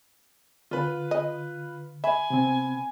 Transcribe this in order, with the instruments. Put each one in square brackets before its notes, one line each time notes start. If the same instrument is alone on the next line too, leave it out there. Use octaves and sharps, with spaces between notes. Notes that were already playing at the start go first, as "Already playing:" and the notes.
[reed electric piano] D3 [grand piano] F4 B4
[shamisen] D#5
[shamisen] E5 [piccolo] G#5 [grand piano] B5
[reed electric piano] C3 B3 C4